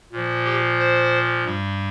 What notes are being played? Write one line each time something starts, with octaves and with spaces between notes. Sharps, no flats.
A#2 F3
G4
C5
G2 G3